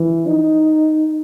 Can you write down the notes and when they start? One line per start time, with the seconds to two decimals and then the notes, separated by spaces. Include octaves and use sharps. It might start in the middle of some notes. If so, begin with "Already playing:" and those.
Already playing: E3
0.28 D#4